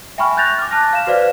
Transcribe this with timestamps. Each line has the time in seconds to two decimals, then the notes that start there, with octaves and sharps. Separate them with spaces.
0.18 E5 G5 G#5 B5 C#6 F6
0.37 F#6 G6 A6 A#6 F7
0.59 D6 F6
0.71 A5 F6 F#6 A#6
0.93 F5 E7
1.07 F#4 B4 C5 D5 F5